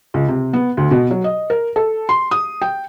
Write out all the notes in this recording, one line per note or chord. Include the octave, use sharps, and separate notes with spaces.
C#2
C3
B3
D2
B2
F#3
D#5
A#4
A4
C6
D#6
G5